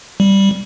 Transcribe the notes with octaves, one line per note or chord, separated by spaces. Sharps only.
G3